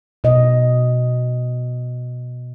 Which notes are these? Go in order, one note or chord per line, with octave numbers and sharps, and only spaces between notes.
B2 D#5